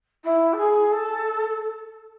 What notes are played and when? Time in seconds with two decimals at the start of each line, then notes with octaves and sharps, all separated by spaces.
0.24 E4
0.53 A4
0.58 G#4
0.92 A4